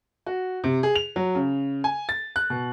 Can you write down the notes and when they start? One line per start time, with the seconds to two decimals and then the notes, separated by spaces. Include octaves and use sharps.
0.27 F#4
0.64 C3
0.83 G#4
0.95 F7
1.16 F#3
1.35 C#3
1.84 G#5
2.09 A6
2.36 F#6
2.50 B2